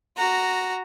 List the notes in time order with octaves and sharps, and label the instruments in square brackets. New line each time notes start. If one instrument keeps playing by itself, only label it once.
[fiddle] F#4 A#5